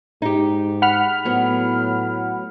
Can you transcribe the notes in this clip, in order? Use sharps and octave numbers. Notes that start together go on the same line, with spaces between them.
G#2 D#4 G4
F#5 B5 F6
A2 F#3 B3